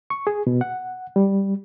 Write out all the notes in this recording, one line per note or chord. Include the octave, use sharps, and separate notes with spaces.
C#6
G#4
B2
F#5
G3